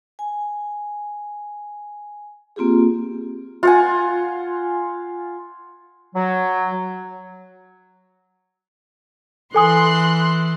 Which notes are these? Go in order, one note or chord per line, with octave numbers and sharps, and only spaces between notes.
G#5
A#3 C4 F4 G4 G#4
F4 F#5 G#5
F#3
E3 A4 G#5 C6 D#6 F#6